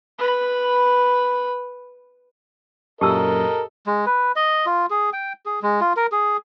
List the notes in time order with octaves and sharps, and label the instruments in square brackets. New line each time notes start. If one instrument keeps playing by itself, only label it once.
[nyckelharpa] B4 B5
[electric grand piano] F#2 A#2 [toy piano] G4 A5 E6 [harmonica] A4 D#5 [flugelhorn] A#4
[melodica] G#3
B4
D#5
F4
G#4
G5
G#4
G#3
F4
A#4
G#4